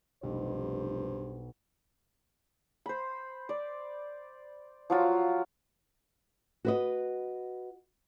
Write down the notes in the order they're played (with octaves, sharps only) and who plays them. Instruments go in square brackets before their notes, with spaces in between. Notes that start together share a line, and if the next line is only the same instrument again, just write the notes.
[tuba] F1 [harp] B1 [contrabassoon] G2 [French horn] C5
[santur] C5 B5
D5
F3 F#3 F4
[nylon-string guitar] F#4 B4 D#5